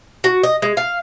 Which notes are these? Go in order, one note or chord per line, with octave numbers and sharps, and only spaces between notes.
F#4
D#5
G#3
F5